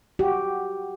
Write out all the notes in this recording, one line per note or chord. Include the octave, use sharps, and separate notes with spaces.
F#4 G4